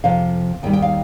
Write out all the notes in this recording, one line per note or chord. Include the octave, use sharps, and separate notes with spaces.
F2 C3 F3 F5
D#2 D#3 G3 G5
G5
F5